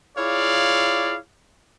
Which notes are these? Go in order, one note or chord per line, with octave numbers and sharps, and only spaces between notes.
E4 F4 G#4 C#5 D5 F5